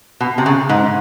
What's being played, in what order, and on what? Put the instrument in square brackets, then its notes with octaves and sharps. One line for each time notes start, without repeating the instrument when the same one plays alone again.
[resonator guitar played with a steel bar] B2
C3
C#3
G#2